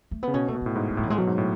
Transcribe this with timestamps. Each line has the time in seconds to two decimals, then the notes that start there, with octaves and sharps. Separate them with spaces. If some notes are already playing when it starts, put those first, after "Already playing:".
0.11 A3
0.23 C#3 B3
0.34 B2 C#4
0.48 A3
0.55 B2
0.61 A2 B3
0.76 G#2 D3
0.89 F#2
0.97 A2 F#3
1.03 E3
1.08 A2 G#3
1.17 B2 F#3
1.27 G#2
1.38 A2